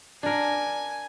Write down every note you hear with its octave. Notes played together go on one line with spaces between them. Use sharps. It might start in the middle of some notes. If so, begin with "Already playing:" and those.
D4 A#4 G#5